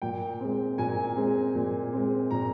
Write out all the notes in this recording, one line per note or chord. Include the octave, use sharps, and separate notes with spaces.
A#2 G5
G#3 C4
A#2 G#5
G#3 C4
A#2
G#3 C4
A#2 A#5